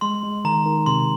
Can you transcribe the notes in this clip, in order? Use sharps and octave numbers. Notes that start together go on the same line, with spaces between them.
G#3 C6
G#3
D#3 A#5
D#3
C3 C6